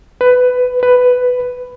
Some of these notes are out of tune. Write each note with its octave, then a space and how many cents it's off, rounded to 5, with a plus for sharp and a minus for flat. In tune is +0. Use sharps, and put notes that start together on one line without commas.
B4 +15
B4 +10